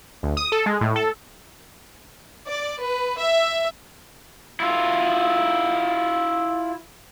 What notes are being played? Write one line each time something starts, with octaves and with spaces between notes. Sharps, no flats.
D2
D#6
A4
G#3
A2
A4
D5
B4
E5
E4 F4